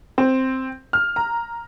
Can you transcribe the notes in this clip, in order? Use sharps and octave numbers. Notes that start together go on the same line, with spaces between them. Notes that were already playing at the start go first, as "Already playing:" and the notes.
C4
F6
A#5